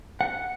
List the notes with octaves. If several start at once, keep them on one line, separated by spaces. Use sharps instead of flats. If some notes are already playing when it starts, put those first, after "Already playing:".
F#5